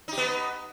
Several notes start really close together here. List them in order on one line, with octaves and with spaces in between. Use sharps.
D#4 G4 B3